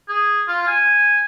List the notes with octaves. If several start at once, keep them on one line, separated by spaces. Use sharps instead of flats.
G#4
F4
G#5